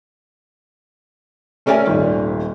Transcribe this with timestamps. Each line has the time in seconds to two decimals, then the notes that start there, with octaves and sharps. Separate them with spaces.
1.66 A3 C#4 A#4 D5 E5 G#5
1.87 D#1 G#1